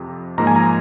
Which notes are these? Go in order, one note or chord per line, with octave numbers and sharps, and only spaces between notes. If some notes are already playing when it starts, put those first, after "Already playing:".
Already playing: F2 C3 F3
G#2 F3 A#3 A#5
G#5
A#5